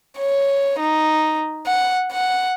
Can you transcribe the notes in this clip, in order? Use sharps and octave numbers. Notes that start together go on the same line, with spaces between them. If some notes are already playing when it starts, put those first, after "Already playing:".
C#5
D#4
F#5
F#5